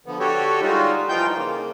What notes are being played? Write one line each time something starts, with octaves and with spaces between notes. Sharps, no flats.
D3 F3 B3
D3 F#4 G4 A4 C#5
G3 G#3 D#4 F4 F#4
E3 F3 D#4 F4 G5 G6
C#3 A#3